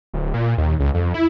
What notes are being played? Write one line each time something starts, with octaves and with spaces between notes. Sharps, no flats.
D1
A#2
D#2
C#2
F2
E4